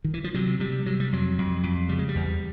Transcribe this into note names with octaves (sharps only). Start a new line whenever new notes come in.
D#3
E3
F3
C3 F#3
C3 G3
C3 F#3
G3
F2 F#3
F2
F2
C#3 G3
G#3
G3
E2